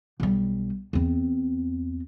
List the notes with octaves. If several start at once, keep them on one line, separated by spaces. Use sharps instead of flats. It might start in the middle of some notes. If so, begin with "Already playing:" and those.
B1 G3
E2 C4